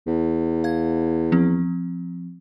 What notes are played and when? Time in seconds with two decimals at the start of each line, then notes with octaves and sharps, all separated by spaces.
0.07 E2
0.64 F5 G#6
1.32 F3 C4